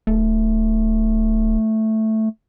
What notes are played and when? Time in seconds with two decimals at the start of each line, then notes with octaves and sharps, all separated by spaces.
0.07 D1 A3